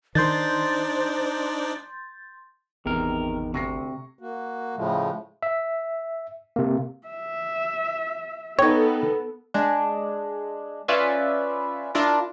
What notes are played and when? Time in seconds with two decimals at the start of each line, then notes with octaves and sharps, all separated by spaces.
0.15 D#3 D4 D#4 C5 D5 C6 G6 A6
2.85 G#1 E2 C3 D#3 A#4
3.54 D2 C3 C#6 A#6 C7
4.19 A#3 F#4
4.76 A2 C#3 F3 G#3 A3
5.43 E5
6.56 C3 A#3
7.08 E5
8.59 B3 D#4 A4 C#5 G5
9.54 G#3 D4
10.88 C#4 F4 B4 D5 E5
11.95 D4 E4 F4 A#4